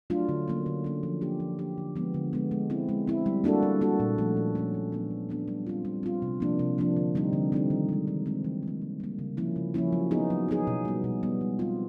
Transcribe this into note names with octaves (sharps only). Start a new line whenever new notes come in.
F#3 A3 D4 F4
D3
F#3 A#3 C#4
D3
F#3 A#3 C#4
F3
A#3 D4 G4
F3
A#3 D4 G4
D3
F3 G#3 B3
D3
F3 G#3 B3
G#3
C4 E4
G#3
C4 E4
G3
A#3 D4 F#4 A4
G3
A#3 D4 F#4 A4
A#2
F3 A3 C#4
A#2
F3 A3 C#4
A#2
F#3 B3 D4
A#2
F#3 B3 D4
G3
C4 F4
G3
C4 F4
C3
F3 A#3 D4
C3
F3 A#3 D4
D3
G3 C4 D#4
D3
G3 C4 D#4
D#3
G#3 C4
D#3
G#3 C4
E3
G3 A#3
E3
G3 A#3
C#3
F3 A#3 C#4 E4
C#3
F3 A#3 C#4 E4
F#3
B3 D#4 G#4
F#3
B3 D#4 G#4
B2
G3 B3
B2
G3 B3
G#3
C4 F4